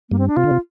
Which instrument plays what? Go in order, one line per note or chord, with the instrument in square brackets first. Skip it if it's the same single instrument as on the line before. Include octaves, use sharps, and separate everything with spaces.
[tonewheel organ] G2 [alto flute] A#3
[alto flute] C4
D4
[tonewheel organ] C3 [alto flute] F4
[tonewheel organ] D3
C3